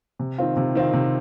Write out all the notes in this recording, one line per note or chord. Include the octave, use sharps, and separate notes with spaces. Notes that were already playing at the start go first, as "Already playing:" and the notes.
C3
D#3 C4 F4
C3
D#3 C4 F4
C3